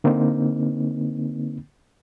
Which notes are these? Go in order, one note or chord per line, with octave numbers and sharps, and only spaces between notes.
D3 A#3 C4 D#4